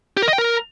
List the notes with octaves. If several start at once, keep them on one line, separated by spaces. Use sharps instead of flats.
G4
A#4
D#5
G5
A#4